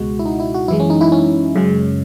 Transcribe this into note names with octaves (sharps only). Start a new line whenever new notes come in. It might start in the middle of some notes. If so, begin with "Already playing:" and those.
Already playing: C#2 B2 G#3 F#4
E4
D#4
E4
F#4
F#2 E3 G#3 E4
C#4
D#4
E4
C#4
F#2 C#3 G#3